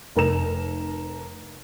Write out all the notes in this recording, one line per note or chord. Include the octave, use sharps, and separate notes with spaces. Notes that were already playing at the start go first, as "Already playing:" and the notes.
F1 A#4 A#5 E7